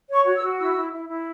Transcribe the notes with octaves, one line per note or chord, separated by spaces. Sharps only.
C#5
C#6
F#4
E6
F#4
E4 E6
E4
E4
E4